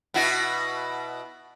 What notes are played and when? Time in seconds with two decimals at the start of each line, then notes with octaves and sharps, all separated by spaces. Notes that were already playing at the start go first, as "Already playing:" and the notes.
0.14 B2 E4 F#4